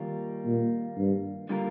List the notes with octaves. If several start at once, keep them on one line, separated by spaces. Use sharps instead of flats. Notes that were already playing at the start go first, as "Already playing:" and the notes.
Already playing: D#3 G3 A#3 F4
A#2
G2
D3 G3 A#3 F4 A#4